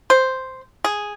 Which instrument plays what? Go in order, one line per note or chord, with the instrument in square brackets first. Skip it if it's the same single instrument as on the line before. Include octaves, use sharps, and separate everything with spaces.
[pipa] C5
G#4